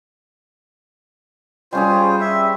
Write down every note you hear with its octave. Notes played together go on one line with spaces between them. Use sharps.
G3 C#4 F4 G#4 C5
E5